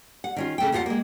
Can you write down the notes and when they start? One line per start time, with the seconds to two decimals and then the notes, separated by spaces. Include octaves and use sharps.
0.24 F#5
0.36 D#3 C#4 F4
0.58 C#3 A3 G5
0.72 E2 C#3 F4 G#4 F#5
0.86 G#3 A#3